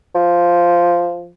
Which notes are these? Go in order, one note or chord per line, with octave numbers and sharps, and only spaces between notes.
F3